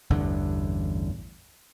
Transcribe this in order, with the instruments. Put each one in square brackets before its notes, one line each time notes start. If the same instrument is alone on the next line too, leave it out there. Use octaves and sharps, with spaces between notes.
[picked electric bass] A1 E2 G2 D3